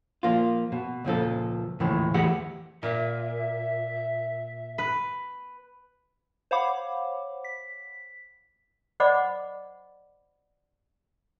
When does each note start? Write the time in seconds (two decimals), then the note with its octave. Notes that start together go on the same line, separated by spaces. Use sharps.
0.23 F3 A#3 F4
0.72 B2
1.05 C#2 A#2 F3 A4
1.80 D#2 A2 C#3 E3 F3
2.14 E2 E3 A3 G4 G#4 F#5
2.83 A#2 E5
4.78 B4
6.51 C5 C#5 F5 F#5 B5 D6
7.45 B6
9.00 C5 D5 D#5 F#5 B5 D6